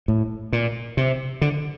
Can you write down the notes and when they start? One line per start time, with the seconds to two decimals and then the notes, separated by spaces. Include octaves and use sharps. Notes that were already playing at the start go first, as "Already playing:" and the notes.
0.08 A2
0.53 A#2
0.97 C3
1.41 D3